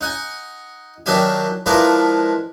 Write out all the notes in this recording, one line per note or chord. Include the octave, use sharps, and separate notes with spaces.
D#4 F#5 G#5
D#3 F#3 D4 G4 E5 G#5
F3 G#3 D4 E4 A#4 B4